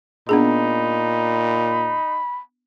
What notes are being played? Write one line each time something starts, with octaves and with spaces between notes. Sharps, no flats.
A#2 B3 D4 D#4 G#4 B5